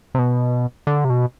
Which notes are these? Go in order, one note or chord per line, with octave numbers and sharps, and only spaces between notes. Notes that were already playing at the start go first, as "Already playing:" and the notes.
C3
B2
D3
C3
B2